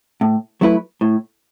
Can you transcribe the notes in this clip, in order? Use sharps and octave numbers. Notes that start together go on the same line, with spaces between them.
A2
F#3 A3 E4 B4
A2